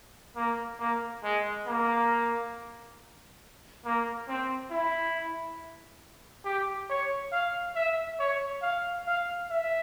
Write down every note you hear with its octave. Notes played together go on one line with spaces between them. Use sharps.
A#3
A#3
G#3
A#3
A#3
C4
E4
G4
C#5
F5
E5
C#5
F5
F5
E5